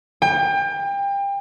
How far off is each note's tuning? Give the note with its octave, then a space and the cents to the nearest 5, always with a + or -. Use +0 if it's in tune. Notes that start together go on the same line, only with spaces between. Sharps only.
G5 +30